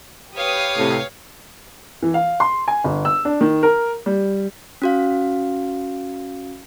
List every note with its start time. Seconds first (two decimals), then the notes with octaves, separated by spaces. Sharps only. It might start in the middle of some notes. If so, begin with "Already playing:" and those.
0.36 G4 B4 C#5 F5 D#6
0.78 A2 C3
2.02 E3
2.14 F5
2.40 C6
2.68 G#5
2.84 G1
3.05 E6
3.25 D4
3.41 D#3
3.63 A#4
4.06 G3
4.82 C#4 F#4 F5